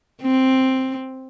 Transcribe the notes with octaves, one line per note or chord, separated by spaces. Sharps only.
C4